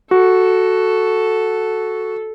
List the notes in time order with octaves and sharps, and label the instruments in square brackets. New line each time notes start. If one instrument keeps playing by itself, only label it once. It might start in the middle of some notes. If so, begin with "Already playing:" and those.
[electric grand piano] F#4 [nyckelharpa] A4